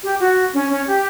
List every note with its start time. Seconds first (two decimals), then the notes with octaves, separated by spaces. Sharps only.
0.03 G4
0.20 F#4
0.54 C#4
0.71 C#4
0.88 G4